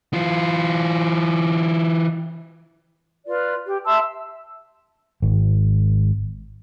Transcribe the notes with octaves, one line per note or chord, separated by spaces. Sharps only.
E3 F4
F4 B4 D5
G4
E5 A5 C6 E6
G#1